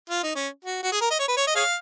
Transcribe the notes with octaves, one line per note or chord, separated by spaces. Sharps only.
F4
D#4
C#4
F#4
F#4
G#4
A#4
D#5
C#5
B4
C#5
D#5
G#4 C#5 F5